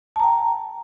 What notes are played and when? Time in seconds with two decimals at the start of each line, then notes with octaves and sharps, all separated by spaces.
0.16 A5
0.20 A#5
0.23 G5